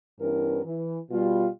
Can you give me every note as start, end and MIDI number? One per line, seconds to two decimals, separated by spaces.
0.21 0.60 43
0.21 0.60 52
0.21 0.60 59
0.21 0.60 61
0.21 0.60 64
0.21 0.60 70
0.64 0.98 52
1.11 1.47 47
1.11 1.47 55
1.11 1.47 65